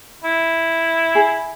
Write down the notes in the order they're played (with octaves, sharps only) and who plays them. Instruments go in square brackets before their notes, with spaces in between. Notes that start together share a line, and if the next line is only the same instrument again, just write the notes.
[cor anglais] E4
[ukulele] G#4